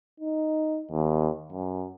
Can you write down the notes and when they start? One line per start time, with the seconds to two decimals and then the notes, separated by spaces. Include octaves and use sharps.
0.20 D#4
0.91 D#2
1.53 F#2